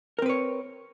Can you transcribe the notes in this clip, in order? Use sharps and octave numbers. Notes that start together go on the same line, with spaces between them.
C4 A#4 B4 C#5